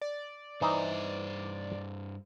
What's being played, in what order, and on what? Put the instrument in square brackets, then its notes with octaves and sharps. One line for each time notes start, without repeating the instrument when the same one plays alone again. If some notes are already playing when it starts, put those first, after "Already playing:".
[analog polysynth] D5
[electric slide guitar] G2 C5 [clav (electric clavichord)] E3 D#4 A#5